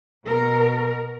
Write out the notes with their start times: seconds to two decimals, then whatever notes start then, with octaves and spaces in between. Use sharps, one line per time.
0.25 B2 A#4